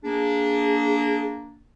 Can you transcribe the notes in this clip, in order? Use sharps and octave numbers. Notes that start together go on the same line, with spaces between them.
A#3 D4 G#4